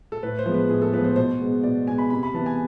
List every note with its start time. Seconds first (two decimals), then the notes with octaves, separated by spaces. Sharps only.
0.12 A4
0.23 A2 B4
0.39 C5
0.46 F3 G#3 B3
0.54 B4
0.69 A2 G#4
0.82 A4
0.93 F3 G#3 B3 B4
1.04 C5
1.16 B2 C5
1.40 G#3 B3
1.63 B2 D5
1.87 G#3 B3 G#5
1.98 B5
2.10 C3 B5
2.23 B5
2.34 E3 B3 A5
2.46 G#5